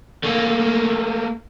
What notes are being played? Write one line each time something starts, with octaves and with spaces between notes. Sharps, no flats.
A3 A#3